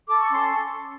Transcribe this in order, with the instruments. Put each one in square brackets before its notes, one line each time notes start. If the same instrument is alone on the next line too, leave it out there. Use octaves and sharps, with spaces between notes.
[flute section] A4 D6
C#6
C#4 C6